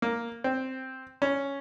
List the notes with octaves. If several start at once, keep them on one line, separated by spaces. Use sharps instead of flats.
A#3
C4
C#4